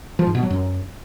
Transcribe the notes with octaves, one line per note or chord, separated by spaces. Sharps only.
F3
G#2
B2
F#3
F#2